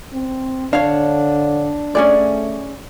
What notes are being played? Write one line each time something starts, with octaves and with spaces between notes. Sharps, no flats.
C4
D3 D4 C#5 F5
A3 C#4 G#4 D5